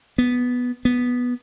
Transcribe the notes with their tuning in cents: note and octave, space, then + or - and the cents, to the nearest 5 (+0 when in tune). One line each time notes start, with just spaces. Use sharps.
B3 +0
B3 -5